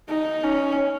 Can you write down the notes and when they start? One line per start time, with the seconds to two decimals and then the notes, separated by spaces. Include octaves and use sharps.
0.09 D#4
0.43 C#4